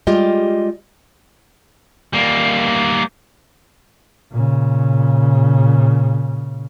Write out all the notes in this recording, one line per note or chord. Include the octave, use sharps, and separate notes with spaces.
G3 G#3 F4 G4 D#5
G3 A#3
A#2 C#3